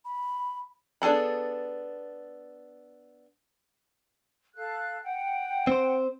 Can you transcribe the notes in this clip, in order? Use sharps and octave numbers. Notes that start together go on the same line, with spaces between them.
B5
B3 D4 G#4 A4 B5
A4 F5 F#6
F#5 G5
C4 C5